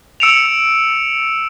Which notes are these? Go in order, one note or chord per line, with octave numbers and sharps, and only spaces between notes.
E6 C#7 D7 E7 F7